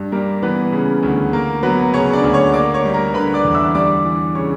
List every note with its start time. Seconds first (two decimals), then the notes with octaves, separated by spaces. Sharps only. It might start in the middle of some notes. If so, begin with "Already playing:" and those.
Already playing: G2
0.12 G3 A#3 A#4
0.43 E3 B3 B4
0.72 C#3
1.03 D2
1.33 A#3 A#4
1.63 F#3 B3 B4
1.94 C#3 C#4 C#5
2.13 D4 D5
2.24 D2
2.33 C#5 C#6
2.54 A#3 D5 D6
2.74 C#5 C#6
2.85 G3
2.94 A#4 A#5
3.14 D3 B4 B5
3.34 D5 D6
3.44 E2
3.54 E5 E6
3.75 G3 D5 D6
4.05 E3
4.35 C#3 C#5 C#6